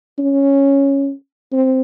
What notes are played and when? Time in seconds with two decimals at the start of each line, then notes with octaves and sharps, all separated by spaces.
0.19 C#4
1.52 C4